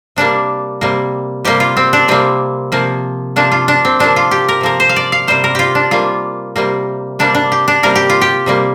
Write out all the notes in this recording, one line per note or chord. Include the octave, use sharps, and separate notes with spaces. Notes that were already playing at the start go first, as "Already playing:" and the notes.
C3 G3 A#3 D4
C3 G3 A#3
C3 G3 A#3 G4
F4
C4
D4
C3 G3 A#3 C4
C3 F3 A#3
C3 F3 A#3 D4
F4
D4
C4
C3 F3 A#3 D4
F4
G4
A#4
C3 F3 A#3 A#4
C5
F5
D5
F5
C3 G3 A#3 C5
A#4
F4 G4
D4
C3 G3 A#3 F4
C3 G3 A#3
C3 G3 A#3 D4
D4
G4
D4
C3 G3 A#3 A#4
G4
F4
G4
C3 G3 A#3